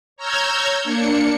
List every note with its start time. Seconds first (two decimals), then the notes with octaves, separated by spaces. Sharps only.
0.16 C#5 A#5 E6 F6 G6 G#6
0.83 A#3 D4 C#7